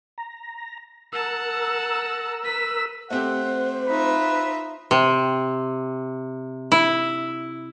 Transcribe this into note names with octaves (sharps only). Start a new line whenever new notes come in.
A#5
A#4 F#5 A5 E6
B4 B6
A3 C4 G4 C5 F#5
D#4 F4 B4 E5
C3
E4